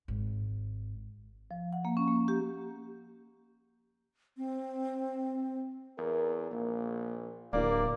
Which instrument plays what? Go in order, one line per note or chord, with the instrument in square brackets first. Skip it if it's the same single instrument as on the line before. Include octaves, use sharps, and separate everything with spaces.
[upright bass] G#1
[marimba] F3
F#5
A#3
C#4
A#3
G4
[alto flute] C4
[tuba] E2 [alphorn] A#4
[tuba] A#1 [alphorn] A#3
[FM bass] D1 [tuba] A#3 [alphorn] A#4 [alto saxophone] D5